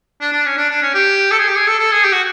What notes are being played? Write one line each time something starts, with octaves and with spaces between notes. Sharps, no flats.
D4
D4
C#4
D4
D4
C#4
G4
A4
G#4
G4
G#4
A4
A4
G#4
G4
F#4